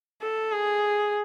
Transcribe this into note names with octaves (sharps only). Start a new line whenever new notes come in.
A4
G#4